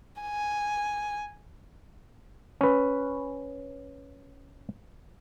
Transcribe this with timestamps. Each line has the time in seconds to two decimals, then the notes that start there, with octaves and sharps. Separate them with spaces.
0.22 G#5
2.61 C#4 B4